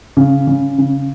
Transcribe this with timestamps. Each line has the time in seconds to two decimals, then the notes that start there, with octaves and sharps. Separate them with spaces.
0.17 C#3
0.47 C#3
0.78 C#3